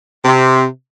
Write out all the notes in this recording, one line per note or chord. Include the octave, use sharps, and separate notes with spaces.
C3